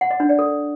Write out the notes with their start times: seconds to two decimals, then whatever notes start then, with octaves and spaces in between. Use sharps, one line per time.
0.01 F#5
0.10 D#5
0.20 D4
0.29 D5
0.39 A4